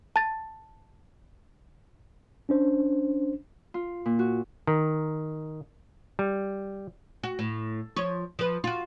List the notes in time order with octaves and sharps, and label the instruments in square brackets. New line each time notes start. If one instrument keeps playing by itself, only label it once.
[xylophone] A5 A6
[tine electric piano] C#4 D4 C5
[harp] F4
A#2
F#4
[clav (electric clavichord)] D#3
G3
[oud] F#4
A2
F3 C#5
F3 B4
F4 F#4